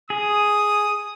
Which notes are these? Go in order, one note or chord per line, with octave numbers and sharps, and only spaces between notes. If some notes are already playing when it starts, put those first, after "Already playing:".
G#4 D#6